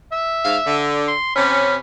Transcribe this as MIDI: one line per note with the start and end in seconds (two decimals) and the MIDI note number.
0.12 0.81 76
0.43 0.56 44
0.43 0.56 77
0.65 1.12 50
1.08 1.33 84
1.35 1.75 48
1.35 1.75 61
1.35 1.76 83